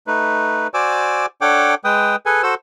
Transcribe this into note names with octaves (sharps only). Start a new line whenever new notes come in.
A3 D#4 B4
F#4 C5 D5 G#5 D6 E6
D4 A4 C#5 F#5 G5 D6
G#3 B4 G5 D#6
G#4 A4 B4 G#5
F#4 A4 C5 E6